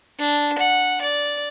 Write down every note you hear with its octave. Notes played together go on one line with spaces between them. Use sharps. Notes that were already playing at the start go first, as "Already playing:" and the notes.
D4
F#5
D5